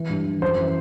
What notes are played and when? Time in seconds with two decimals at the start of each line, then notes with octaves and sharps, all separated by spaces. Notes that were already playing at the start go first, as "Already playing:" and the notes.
Already playing: E3
0.09 G2
0.26 E3
0.42 F#2 C5
0.58 E3